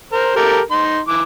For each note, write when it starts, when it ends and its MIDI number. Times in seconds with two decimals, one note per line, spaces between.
0.13 0.36 70
0.13 0.36 72
0.36 0.60 67
0.36 0.60 69
0.36 0.60 70
0.71 1.00 63
0.71 1.00 84
1.08 1.22 52
1.08 1.22 86